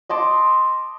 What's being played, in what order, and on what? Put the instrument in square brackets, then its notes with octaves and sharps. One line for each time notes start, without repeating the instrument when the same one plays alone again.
[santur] D#5 A5 C6 D6